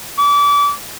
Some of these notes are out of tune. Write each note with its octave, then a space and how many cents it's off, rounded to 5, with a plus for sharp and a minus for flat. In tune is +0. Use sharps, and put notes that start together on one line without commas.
D6 -30